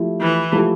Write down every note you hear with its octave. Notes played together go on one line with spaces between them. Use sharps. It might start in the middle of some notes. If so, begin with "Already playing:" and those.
Already playing: F3 A3 E4 G4
E3
F3 A3 E4 G4